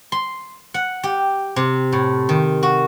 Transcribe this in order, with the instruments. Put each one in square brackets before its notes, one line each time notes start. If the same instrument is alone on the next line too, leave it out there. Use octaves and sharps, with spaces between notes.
[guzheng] C6
F#5
G4
C3
A2
D#3
F#4